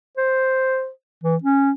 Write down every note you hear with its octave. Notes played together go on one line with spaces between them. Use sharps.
C5
E3
C#4